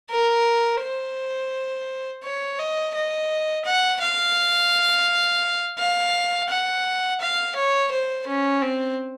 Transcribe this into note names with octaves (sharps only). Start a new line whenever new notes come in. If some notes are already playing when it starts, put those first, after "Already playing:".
A#4
C5
C#5
D#5
D#5
F#5
F5
F5
F#5
F5
C#5
C5
C#4
C4